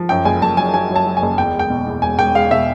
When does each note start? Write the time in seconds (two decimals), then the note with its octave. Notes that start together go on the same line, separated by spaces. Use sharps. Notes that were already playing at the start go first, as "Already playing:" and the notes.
Already playing: F3
0.09 F#2 G5
0.25 F#1 G#5
0.42 F#1 A5
0.57 F#3 G#5
0.73 F#3 G#5
0.90 F#3
0.96 A5
1.06 F#3
1.17 G#5
1.22 F#1
1.38 E2 G5
1.54 G#3
1.59 G5
1.70 B2
1.86 E2
2.02 E1 G#5
2.18 E1 G5
2.35 G#3 F5
2.51 B2 E5